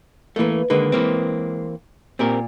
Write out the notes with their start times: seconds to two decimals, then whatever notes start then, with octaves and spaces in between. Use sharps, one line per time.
0.36 E3 A3 A#3 B4
0.70 D3 D#3 G#3 A#3 B4
0.92 E3 A#3 C4
2.19 A#2 C4 G4 A#4